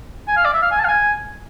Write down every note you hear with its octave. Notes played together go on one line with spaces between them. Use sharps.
G#5
F5
D5
E5
F5
G#5
A5
F5
G#5